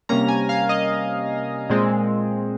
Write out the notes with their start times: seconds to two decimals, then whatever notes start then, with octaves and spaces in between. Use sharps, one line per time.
0.09 C3 G3 A#3 C#4 A#5
0.28 G#5
0.49 F5
0.69 D#5
1.70 A#2 G#3 C4